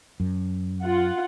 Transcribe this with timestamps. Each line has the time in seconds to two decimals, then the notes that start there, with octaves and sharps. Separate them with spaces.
0.20 F#2
0.84 F4 F#5